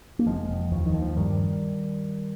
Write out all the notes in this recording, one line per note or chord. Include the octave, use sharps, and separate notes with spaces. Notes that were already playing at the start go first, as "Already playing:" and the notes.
A#3
F1 F3 G#3
F1
D#2 F3
D#3
D#2
F3
G2 D#3 G3